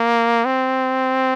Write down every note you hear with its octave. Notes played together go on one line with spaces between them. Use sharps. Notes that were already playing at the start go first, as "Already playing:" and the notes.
Already playing: A#3
C4